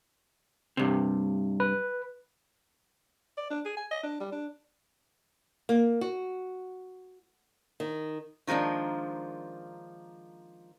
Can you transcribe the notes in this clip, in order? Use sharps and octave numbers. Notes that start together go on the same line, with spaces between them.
G2 C3
B4
D5
D4
G#4
G#5
D#5
D4
G3
D4
A#3
F#4
D#3
D#3 F3 G#3 A#3 D4